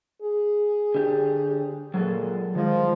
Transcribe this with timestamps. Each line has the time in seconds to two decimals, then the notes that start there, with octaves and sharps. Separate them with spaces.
0.22 G#4
0.95 D3 G4
1.94 A#2 F#3 G#4 A4
2.55 D#3 F3 G#3